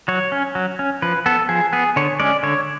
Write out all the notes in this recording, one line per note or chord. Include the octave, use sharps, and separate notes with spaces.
F#3 C#5
C#4
F#3
C#4
F3 B4
B3 A4
F3 G#4
B3 G#4
D3 C#5
G#3 C#4 D5
D3 C#5